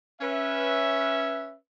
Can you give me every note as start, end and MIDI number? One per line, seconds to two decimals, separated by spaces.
0.21 1.55 61
0.21 1.55 71
0.21 1.55 76